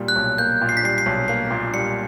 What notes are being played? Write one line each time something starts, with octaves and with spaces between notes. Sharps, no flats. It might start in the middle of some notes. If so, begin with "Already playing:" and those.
Already playing: A#2 G3 A#3
F#6
B1
A#3 G6
A#2
C7
B6
G3 C7
C7
B1
A#3 C7
A#2
G3 C#7